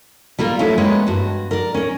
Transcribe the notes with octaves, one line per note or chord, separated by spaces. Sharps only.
G3 A#3 F4 A#4
F#3 A3 C#4 D4 E4
G#3 A#3 B3 G4 B4 C#5
G2 F#4
A#4 D5
C#4 A#4